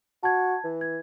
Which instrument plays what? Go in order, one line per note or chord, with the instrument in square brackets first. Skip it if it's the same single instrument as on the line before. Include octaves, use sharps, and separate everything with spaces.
[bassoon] F#4 [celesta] A5 G#6
[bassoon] E3
[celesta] G#6